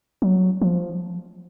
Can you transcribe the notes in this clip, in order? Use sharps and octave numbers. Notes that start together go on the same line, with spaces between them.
F#3
F3